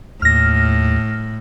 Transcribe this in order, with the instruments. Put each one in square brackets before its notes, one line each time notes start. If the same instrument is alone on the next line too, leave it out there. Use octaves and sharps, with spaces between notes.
[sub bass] D#2 [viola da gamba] A2 [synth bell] F6 A#6